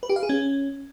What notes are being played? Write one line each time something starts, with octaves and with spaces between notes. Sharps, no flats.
B4
G4
F5
G#4
C#4